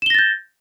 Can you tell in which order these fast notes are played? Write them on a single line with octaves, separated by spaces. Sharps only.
E7 G7 A#6 A6 G6